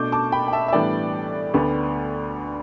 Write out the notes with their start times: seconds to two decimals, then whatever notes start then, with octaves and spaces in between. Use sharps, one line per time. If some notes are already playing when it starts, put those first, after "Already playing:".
Already playing: B2 A3 D4 D6 G6
0.12 A5 D6
0.32 G5 B5
0.48 G5
0.53 E5 A5
0.68 E5
0.73 A2 E3 G3 B3 D4 D5 G5
1.54 D2 D3 B3 D4